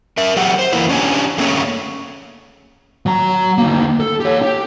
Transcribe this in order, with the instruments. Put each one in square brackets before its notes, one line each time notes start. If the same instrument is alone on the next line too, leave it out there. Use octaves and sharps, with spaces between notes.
[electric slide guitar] A#4 E5
F#3 G4 G#4 F#5
C5
E2 A#3 E4 B4
C#4 D4 G4 F5 G#5
A3 A#3 C#4 G#4 C5 C#5
[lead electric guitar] F#3 A#5
D2 A#3
A4
G4 C#5
G4